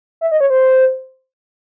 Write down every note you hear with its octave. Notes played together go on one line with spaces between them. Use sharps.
E5
D#5
C#5
C5